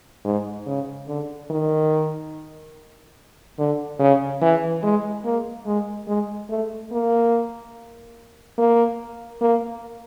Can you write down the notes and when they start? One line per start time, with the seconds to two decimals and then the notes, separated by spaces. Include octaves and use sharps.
0.25 G#2
0.67 C#3
1.08 D3
1.50 D#3
3.59 D3
4.00 C#3
4.41 E3
4.83 G#3
5.25 A#3
5.66 G#3
6.08 G#3
6.50 A3
6.92 A#3
8.58 A#3
9.41 A#3